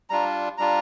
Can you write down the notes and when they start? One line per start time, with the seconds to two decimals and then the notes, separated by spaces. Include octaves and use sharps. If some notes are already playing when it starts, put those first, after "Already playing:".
0.10 G3 D4 F4 A#5
0.58 G3 D4 F4 A#5